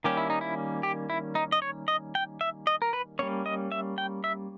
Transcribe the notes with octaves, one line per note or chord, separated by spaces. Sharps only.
D#3 G3 A#3 C#4 G4
E4
D#4
E4
G4
E4
D#4
D#5
C#5
D#5
G5
E5
D#5
A#4
B4
G3 A#3 C#4 C#5
D#5
E5
G5
E5